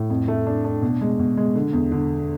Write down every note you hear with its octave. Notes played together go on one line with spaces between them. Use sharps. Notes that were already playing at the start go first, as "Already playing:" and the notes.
Already playing: A2
F2
A3
D4
D4
B2
G#3
B2
G#3
D3
E2
D3